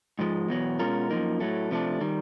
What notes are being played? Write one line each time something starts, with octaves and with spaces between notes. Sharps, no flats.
G#2 F3 G#3
E2 B2 F#3
B2 G#3 C#4 F4 A#4
F#2 C#3 F3 A#3 D#4
A2 F#3 A3
C3 F3 A3 D4
D#3 G3